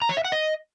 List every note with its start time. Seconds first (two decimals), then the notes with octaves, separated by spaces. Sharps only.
0.02 A#5
0.09 C#5
0.17 E5
0.24 F#5
0.32 D#5